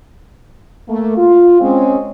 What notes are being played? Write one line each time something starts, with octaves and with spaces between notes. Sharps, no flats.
A3 A#3
F4
G#3 C4 C#4